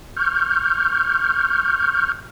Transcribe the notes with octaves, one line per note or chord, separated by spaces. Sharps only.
C#6 F6 G6